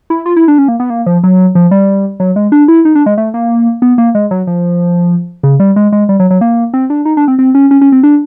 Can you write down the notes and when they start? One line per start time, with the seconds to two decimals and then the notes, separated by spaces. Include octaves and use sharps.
0.10 E4
0.26 F4
0.36 E4
0.48 D4
0.58 C#4
0.68 A#3
0.80 B3
0.90 A#3
1.06 F3
1.23 F#3
1.55 F3
1.71 G3
2.20 F#3
2.36 G#3
2.52 D4
2.68 E4
2.85 D#4
2.95 D4
3.06 G#3
3.18 A3
3.34 A#3
3.82 B3
3.98 A#3
4.15 G#3
4.31 F#3
4.47 F3
5.43 C#3
5.60 G3
5.76 G#3
5.92 G#3
6.09 G3
6.20 F#3
6.30 F#3
6.41 A#3
6.74 C4
6.90 D4
7.05 D#4
7.17 D4
7.28 C4
7.39 C4
7.55 C#4
7.71 C#4
7.81 C#4
7.92 C4
8.03 D4